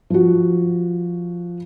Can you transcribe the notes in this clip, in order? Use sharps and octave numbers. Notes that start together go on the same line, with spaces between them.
F3 F#4